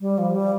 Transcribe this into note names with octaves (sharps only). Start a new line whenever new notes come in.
G3
F3
G3